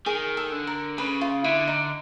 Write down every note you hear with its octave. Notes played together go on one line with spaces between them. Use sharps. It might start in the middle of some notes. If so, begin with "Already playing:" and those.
D#3 G#4
A4
D3
A#4
C#3 B4
F4
D3 E4
D#4